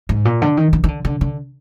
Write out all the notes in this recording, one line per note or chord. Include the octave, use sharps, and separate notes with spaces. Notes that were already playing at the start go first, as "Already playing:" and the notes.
G#2
A#2
D3
D#3
D#3
D#3
D3
D3
D3